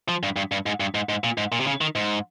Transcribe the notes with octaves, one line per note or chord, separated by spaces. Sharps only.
F3
G2
G2
G2
G#2
G2
G#2
G#2
A#2
G#2
A#2
C3
C#3
D#3
G#2